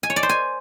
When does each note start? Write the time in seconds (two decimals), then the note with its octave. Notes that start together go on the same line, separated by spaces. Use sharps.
0.03 G#5
0.10 C#5
0.16 D5
0.23 C5
0.29 G#5